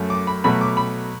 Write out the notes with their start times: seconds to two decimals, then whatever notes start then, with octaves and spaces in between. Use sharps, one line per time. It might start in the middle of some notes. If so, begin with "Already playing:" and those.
Already playing: F#2 F#3 A3
0.10 D6
0.27 B5
0.44 B2 F#3 A3 B5
0.61 D6
0.77 B5